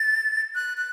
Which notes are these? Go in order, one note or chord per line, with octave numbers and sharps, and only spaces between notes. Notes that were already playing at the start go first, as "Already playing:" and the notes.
Already playing: A6
F#6
F#6